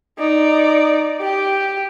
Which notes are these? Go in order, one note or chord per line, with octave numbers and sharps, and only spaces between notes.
D#4 D5
G4